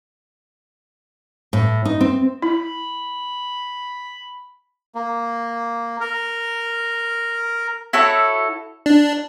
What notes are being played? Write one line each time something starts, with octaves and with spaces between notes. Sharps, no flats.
A2
D#4
C4
E4 B5
A#3
A#4
E4 F#4 A4 C#5
D4